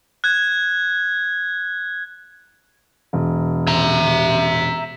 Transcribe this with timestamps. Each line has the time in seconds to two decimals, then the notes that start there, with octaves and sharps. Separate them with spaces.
0.24 F#6 G#6
3.13 E1
3.67 E5 A#5